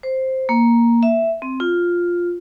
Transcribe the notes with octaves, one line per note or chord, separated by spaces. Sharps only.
C5
A#3
E5
C4
F4